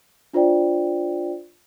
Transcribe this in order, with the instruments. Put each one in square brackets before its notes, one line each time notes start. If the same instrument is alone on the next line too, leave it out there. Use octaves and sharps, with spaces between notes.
[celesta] D4 F4 C5 D5 G5